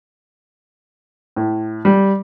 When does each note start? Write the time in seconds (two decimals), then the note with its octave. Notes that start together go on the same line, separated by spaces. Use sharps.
1.36 A2
1.85 G3